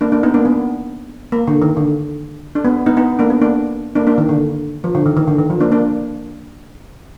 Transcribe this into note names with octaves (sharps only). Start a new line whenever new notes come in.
A#3 D4
A#3 D4
B3 D#4
A#3 D4
B3
A#3
D3
D#3
D3
D4
B3
B3 D#4
B3 D#4
A#3 D4
B3
A#3 D4
A#3 D4
A#3 D4
D#3
D3
F3
D3
D#3
D#3
D3
D#3
F3
A#3 D4
A#3 D4